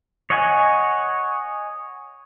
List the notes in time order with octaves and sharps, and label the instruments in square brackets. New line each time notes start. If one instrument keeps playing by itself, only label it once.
[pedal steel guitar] C#5 D#5 F#5 G#5